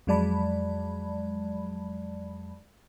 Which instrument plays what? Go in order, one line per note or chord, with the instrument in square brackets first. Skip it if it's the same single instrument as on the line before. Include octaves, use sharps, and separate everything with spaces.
[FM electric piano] F2 F#3 G#3 D5 A5 B5